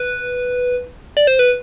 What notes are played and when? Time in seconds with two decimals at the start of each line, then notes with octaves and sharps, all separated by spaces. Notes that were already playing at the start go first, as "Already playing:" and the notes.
Already playing: B4
1.17 D5
1.27 C5
1.39 B4